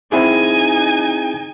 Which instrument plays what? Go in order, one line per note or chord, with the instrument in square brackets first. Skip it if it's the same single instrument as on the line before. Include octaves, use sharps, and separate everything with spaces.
[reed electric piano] C4 E4 G#4 [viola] D#4 G#5